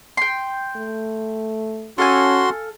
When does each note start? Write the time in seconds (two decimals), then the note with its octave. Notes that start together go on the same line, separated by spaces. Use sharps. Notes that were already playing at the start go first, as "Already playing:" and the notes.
0.17 G5 C6
0.76 A3
1.98 C#4 F#4 A4 F5 G#5 C6